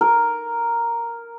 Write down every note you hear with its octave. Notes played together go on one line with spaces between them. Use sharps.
A#4